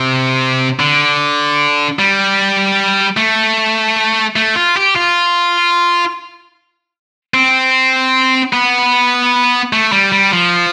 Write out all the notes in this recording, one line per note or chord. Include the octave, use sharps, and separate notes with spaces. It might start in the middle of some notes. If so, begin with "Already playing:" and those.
Already playing: C3
D3
G3
A3
A3
F4
G4
F4
C4
B3
A3
G3
G3
F3